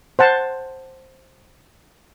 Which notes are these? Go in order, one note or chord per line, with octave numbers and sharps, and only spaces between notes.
C5 F#5 A5